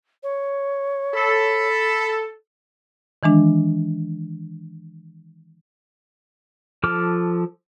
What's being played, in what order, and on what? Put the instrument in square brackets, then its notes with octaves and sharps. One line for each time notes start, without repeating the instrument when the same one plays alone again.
[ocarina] C#5
[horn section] A4 [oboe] B5
[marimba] D#3 E3 G#3 D4
[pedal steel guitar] F3 A4 D6 F6